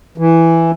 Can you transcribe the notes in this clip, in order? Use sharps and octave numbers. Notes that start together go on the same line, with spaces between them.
E3